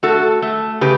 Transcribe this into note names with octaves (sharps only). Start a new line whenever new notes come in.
A3 F#4 A4
A3
C#3 G4 B4